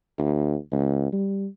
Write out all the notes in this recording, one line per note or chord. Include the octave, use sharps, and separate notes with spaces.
D2
C#2
G3